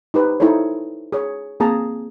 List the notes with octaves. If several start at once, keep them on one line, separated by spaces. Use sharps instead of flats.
D#4 G4 B4 C5
D#4 E4 A4 C5 C#5
G#4 C#5
A#3 C4 G#4 A5 A#5